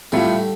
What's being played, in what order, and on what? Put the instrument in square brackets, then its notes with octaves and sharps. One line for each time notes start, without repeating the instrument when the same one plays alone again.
[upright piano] A2 A3 F4 [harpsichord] D3 G3